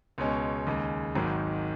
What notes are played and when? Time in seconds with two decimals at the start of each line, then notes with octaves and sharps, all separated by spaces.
0.18 C#2 B2 G#3 C#4
0.67 D#2 C#3 G#3
1.15 G#1 G#2 D#3 F#3